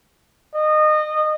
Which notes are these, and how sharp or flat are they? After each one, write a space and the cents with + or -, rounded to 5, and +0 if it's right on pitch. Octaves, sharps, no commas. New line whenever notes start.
D#5 -25